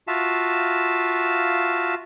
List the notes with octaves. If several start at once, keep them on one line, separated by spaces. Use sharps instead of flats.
F4 F#4 E5 F5 A5